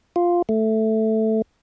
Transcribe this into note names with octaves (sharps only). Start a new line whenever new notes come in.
F4
A3